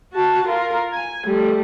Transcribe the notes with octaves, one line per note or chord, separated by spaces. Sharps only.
F#4 A5
F4 A#4
G#5
G3 A3